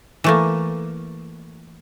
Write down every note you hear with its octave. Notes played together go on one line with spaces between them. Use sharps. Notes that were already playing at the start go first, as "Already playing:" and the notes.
E3 A3 A#3